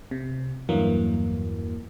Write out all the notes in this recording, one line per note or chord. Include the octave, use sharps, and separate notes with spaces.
C3
E2 G2 E3 F#3 A#3